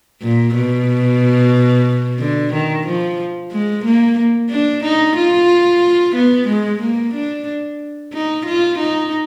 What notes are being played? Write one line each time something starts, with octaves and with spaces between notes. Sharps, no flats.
A#2
B2
D3
D#3
F3
G#3
A#3
D4
D#4
F4
B3
G#3
A#3
D4
D#4
F4
D#4